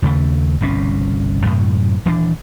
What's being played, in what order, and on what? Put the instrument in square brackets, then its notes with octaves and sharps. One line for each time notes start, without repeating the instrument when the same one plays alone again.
[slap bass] D#2 C#3 A3
G1 C2 B2 C#4
F#2 A2 C3
D#1 E3 D4